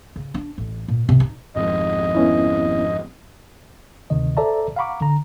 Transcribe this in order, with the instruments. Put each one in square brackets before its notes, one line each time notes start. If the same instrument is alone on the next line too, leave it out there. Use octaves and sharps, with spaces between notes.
[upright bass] C#3
D4
A1
A#2
C3
D#4
[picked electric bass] G#1 F2 G#2 [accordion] D#5
[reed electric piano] B3 C#4 E4
[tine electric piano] D2 C3 D#3 D#5
A4 C5 D5 E5 A5 A#5
F5 F#5 A#5 B5 C#6 D6
D3 A#5